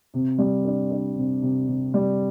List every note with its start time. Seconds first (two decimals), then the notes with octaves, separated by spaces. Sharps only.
0.14 C3
0.38 G3
0.65 D4
0.90 D4
1.17 C3
1.42 C3
1.68 C3
1.94 G3